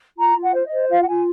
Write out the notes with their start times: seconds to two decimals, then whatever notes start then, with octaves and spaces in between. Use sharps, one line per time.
0.17 F4 A#5
0.35 F4
0.42 F#5
0.54 C5
0.65 D#5
0.72 C5
0.89 F4 F5
1.01 F#5
1.07 F4 G#5